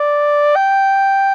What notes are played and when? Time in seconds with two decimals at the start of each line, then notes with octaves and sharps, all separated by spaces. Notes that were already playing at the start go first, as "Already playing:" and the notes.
Already playing: D5
0.56 G5